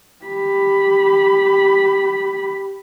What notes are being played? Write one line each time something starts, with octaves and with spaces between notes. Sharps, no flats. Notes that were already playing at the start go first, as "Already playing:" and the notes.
G4 B5